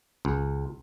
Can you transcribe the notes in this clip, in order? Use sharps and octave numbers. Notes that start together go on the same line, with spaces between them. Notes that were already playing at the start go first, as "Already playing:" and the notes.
C#2